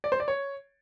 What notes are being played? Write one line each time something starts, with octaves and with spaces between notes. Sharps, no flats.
D5
C5
D5
C#5